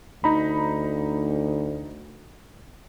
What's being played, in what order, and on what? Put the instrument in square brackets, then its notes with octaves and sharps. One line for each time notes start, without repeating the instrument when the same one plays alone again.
[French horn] D2 [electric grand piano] D#4 A#5 B5